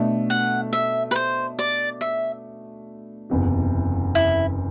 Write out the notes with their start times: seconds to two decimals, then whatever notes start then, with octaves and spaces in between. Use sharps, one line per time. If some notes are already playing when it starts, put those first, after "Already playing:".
Already playing: B2 A3 D4
0.30 F#5
0.73 E5
1.11 B4
1.16 C5
1.59 D5
2.01 E5
3.30 F#1 E2 C3
4.15 E4